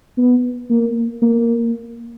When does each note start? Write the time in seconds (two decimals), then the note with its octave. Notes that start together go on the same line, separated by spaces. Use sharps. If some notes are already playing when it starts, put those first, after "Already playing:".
0.17 B3
0.70 A#3
1.22 A#3